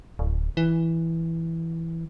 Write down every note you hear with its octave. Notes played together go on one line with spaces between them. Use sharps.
D1
E3